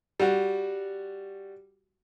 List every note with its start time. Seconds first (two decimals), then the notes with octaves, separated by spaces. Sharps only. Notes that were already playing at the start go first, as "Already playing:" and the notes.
0.20 G3 F#4